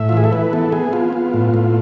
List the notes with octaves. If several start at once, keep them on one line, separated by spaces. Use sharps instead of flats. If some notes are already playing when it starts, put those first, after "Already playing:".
Already playing: A2 E5
F4
E3 G#4
A4
E3 B4
B3 A4
B3 G#4
B3 F4
B3
A2
A2